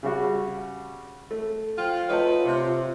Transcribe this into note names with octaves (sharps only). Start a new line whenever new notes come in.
C#3 G3 F#4
A3
F3 F4 G5
A3 D#4 F4 B4 C#5 G5 A5
C3